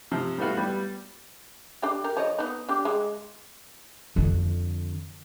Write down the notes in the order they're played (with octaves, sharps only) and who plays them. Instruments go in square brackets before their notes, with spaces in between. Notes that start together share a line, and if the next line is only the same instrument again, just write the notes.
[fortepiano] C3 F3
G3 A3 B3 F4 F#4
G3 B3
[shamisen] D4 G4
G4 A#4
F3 C#5 D#5
B3 D#4
D4 G4
G#3
[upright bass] F2 D3